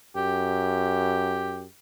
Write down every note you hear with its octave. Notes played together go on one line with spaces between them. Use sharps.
F#2 G4